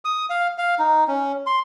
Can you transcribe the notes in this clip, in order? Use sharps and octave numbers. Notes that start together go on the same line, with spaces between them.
D#6
F5
F5
D#4
C#4
C6